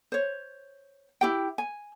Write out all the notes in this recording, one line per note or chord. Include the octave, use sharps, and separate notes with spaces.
C5 C#5
E4 G4 G5
G#5